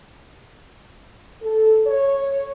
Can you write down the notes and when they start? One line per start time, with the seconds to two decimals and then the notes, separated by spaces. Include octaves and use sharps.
1.42 A4
1.87 C#5